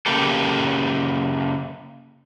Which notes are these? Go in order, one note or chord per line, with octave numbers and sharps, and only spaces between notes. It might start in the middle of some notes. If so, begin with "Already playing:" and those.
C#3 A#3 G4 A4